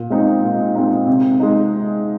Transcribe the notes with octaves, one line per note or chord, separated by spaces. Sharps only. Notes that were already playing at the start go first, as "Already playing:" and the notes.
Already playing: A#2
G#3 C4 D#4
A#2
G#3 C4 D#4
C3
G#3 D#4